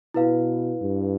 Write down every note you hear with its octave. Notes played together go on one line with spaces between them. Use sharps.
B2 E4 B4 F5
G2